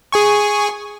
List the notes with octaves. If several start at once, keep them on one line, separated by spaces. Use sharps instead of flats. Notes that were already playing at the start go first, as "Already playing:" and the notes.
G#4 G#5 C#6